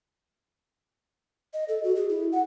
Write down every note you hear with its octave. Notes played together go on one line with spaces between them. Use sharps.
D#5
A4
F#4
G#4
E4
F#5